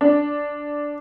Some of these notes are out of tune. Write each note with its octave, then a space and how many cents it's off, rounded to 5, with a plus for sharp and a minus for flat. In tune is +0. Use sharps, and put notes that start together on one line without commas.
D4 -5